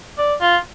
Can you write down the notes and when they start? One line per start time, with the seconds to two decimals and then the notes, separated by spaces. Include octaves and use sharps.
0.18 D5
0.41 F4